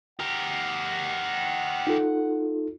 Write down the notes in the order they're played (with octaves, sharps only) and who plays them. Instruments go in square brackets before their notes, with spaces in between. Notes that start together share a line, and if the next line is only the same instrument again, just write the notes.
[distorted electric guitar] G4 A#4 [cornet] F#5
[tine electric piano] D#4 F4 A4